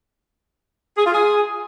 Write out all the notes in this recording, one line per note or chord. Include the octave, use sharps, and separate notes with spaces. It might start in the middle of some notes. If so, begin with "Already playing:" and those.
G#4
F4
G#4